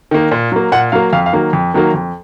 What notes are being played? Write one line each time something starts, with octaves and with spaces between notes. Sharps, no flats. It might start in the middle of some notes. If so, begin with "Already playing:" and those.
D#3 A#3
A#2
F#3 A#3
A#2 F#5
F#3 A#3 F5
F2 F5
F5
D#3 F#3 A#3
F2
D#3 F#3 A#3
F2